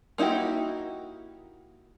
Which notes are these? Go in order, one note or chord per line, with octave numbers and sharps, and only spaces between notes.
A#3 D#4 E4 F#4 G4